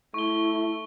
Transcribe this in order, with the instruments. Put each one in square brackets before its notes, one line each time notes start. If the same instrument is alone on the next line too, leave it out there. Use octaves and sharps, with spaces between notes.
[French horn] A3 [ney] E4 [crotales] C#6 G7